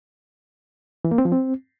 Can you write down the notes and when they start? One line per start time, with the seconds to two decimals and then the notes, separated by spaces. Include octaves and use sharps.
1.05 E3
1.11 A#3
1.18 C4
1.25 F3
1.32 C4